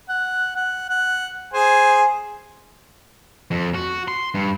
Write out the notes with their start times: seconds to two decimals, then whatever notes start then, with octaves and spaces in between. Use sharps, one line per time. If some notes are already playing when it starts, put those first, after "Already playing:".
0.09 F#5
0.56 F#5
0.89 F#5
1.53 G#4 C5 G#5
3.51 F2
3.75 F#4
4.08 C6
4.35 G2